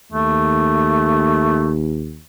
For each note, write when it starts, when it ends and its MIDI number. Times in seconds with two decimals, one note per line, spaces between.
0.12 2.23 39
0.12 1.75 57